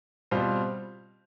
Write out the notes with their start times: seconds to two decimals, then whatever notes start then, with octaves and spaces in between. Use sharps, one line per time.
0.31 B2 G3 C4 F4 C5